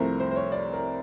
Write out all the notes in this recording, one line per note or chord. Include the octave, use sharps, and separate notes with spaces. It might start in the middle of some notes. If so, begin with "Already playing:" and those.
Already playing: C2 C3 F3 A3 C4 A#4
C5
C5
C#5
D5
A#4